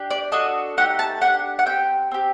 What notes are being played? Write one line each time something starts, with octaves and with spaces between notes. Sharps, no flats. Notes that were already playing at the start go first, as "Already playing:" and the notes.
Already playing: D4 G4
D5
D4 F#4 A4 D#5
A3 D#4 G4 F#5
A5
D4 G4 F#5
F#5
C4 G4 G5
C4 G4